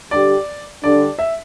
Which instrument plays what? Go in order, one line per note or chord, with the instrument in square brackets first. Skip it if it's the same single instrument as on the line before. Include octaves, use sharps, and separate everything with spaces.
[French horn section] D3 G3 D4 G4 [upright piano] D5
[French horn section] D3 G3 D4 [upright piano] D5
[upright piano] E5